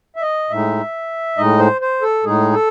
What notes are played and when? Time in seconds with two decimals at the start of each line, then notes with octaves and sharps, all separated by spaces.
0.16 E5
0.22 D#5
0.50 A2 G#3 D#4 E5
1.37 A2 G#3 D#4 D#5
1.59 C5
1.81 C5
2.02 A4
2.24 A2 G#3 D#4 G#4
2.52 A4